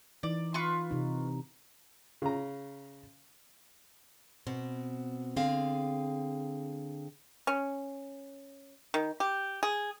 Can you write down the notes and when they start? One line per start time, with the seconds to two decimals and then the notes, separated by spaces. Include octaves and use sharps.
0.23 E3 D#4 D5
0.54 F4 B4 C#6
0.91 C3 D#4
2.22 C#3 A#5
4.47 B2 C4
5.36 D3 C4 G#4 F5
7.47 C#4
8.94 D#3
9.20 G4
9.63 G#4